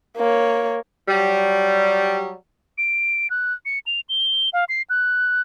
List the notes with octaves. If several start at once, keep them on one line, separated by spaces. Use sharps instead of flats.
A#3 C#5
F#3 G3
D7
F#6
C#7
F7
G7
F5
C7
F#6